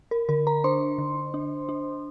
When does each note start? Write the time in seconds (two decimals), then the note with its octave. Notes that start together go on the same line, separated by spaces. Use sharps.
0.11 A#4
0.29 D3 A#4
0.47 A#4 A#5
0.64 D4 C5 C6
0.98 D3
1.34 D4
1.69 D4